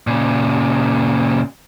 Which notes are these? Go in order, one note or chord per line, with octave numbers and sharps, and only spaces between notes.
A#2 C#3